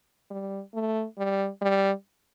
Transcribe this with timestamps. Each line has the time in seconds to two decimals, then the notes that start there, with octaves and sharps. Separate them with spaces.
0.31 G3
0.74 A3
1.18 G3
1.61 G3